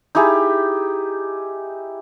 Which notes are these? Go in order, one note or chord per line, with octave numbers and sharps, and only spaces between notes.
D#4 E4 G4 G#4